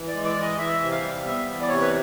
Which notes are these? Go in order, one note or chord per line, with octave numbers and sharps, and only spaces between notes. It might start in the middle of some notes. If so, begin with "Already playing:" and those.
Already playing: E3
D5
G#3
D5
E3 D#5
E3 E5
C3
F5
G3
B3 E5
E3
D5
C3 C#5
B4